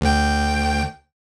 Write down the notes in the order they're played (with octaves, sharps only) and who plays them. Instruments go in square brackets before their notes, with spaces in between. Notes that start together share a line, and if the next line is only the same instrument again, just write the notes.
[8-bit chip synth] D2 G5